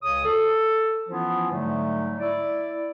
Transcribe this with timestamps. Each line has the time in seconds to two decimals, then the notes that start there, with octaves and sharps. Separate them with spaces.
0.03 C#2 C#3 G#4 C#5 D#6
0.25 A4
1.09 E3 F3 B3 C#4 E4 F4
1.52 G#2 D3 F#3 G3 A3
2.19 E4 D5